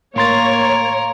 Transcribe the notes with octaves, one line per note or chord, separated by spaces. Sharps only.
A2 A#3 A#4 C#5 C6 A6